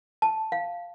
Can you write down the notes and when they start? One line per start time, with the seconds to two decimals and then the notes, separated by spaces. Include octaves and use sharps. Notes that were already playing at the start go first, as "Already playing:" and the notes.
0.22 A5
0.52 F5